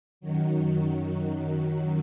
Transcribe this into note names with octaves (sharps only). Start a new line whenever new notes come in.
F#2 D#3 F#3